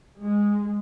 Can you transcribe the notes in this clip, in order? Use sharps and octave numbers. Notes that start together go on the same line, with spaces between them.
G#3